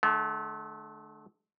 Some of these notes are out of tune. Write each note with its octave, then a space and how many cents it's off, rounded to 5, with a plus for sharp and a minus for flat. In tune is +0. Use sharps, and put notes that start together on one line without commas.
D3 +25 A3 -35